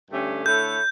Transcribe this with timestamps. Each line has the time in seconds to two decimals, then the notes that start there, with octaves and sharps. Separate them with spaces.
0.11 G2 D3 A3 C#4 G4
0.46 D3 A3 E4 A4 C#5 G6